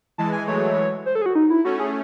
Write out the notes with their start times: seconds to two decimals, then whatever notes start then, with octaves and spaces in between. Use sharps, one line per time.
0.18 E3 G#3 A5
0.33 G#5
0.47 F#3 A3 C#5
1.06 C5
1.15 A4
1.22 G#4
1.26 F#4
1.35 D#4
1.50 E4
1.65 A3 C#4 F#4
1.80 G#4